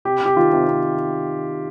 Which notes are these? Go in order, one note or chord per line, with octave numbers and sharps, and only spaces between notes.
C3 G4
C3 G4
D#3 F4
C3
C3